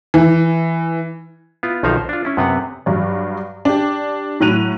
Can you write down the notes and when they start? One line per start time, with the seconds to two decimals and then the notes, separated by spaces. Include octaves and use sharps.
0.14 E3
1.63 B3 E4 F4
1.83 B1 D#3 F3 D#4 E5 F5
1.97 C5
2.09 D4 F4
2.25 C#4 E4
2.37 F#2 C3 B3 C4 B4 F#5
2.86 G2 F#3 D5
3.65 D4 G4
4.40 A2 F#3 F#6 D#7 F7